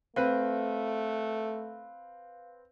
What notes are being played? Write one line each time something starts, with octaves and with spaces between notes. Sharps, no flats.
A3 C4 B4 F5